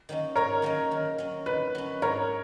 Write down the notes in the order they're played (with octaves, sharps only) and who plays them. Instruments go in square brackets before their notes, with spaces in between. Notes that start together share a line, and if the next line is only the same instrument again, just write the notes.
[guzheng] D#3 F#3 A#3 C#4
[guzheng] G#2 [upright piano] A#4 C#5
[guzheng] D#3 F#3 A#3 C#4
D#3
F#3 C#4
[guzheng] D#3 [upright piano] B4
[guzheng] F#3 C#4
[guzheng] G#2 [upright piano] A#4 C#5